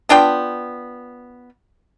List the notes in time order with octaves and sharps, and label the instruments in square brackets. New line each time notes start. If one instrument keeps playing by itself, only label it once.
[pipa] B3 D4 F4 G5